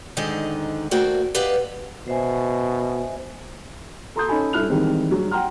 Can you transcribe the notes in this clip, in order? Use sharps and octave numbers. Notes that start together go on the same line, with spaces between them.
G#2 D3 D#3 D#4 D#5
A3 A#3 F#4 C5 D5 G5
G4 B4 D5 D#5 F5 F#5
B2 C5 E5 G#5
A4 A#5 C6 D#6 G6
C#4 D#4 A4 G#5 B5
G2 E4 A4 F6 F#6 F7
D#3 E3 G3 G#3 C4
G2 F#3 G#3 F#4
F#5 G5 A#5 C6 F6